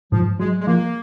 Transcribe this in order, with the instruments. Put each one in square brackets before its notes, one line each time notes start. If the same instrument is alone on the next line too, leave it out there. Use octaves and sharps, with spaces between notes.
[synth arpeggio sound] G#2 [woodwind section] F3
[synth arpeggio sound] F#3 [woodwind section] G#3
[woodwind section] G#3
[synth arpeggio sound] F3 [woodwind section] A#3